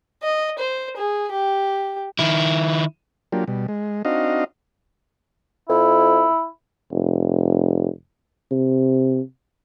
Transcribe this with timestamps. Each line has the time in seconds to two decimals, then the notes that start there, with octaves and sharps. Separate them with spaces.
0.22 D#5
0.58 C5
0.97 G#4
1.31 G4
2.19 D#3 E4
3.32 F#3 A#3 D4 F4 G4
3.48 B2 G3
3.68 G#3
4.05 C4 D4 D#4 F#4 D#5 F5
5.69 F2 E4
6.91 F1
8.51 C3